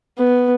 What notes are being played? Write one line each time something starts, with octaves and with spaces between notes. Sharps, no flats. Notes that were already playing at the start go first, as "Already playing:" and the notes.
B3